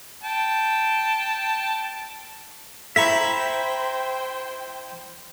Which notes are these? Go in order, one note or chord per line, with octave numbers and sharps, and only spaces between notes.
G5 A5
E4 C5 E5 G5 A#5 B5 C#6 B6